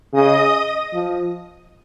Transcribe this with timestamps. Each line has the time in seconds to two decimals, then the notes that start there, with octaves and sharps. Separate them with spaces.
0.13 C#3 D#5 D#6
0.94 F3